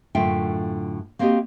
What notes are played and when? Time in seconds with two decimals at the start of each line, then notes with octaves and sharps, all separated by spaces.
0.15 F#2 A2 D3 F4 E5 G5
1.19 A#3 C4 F#4 G4 C#5 D#5